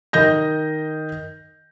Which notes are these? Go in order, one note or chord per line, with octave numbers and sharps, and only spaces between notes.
D#3 D#5 G6 A#6